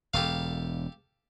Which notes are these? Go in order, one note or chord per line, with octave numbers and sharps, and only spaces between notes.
E1 G4 A4 F5